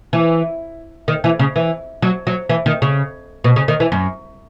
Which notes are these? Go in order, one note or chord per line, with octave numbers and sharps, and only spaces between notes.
E3
D#3
E3
C#3
E3
F#3
F#3
E3
D#3
C#3
B2
C#3
D#3
E3
F#2